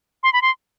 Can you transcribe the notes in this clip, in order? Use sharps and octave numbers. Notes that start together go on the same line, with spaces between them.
C6
B5
C6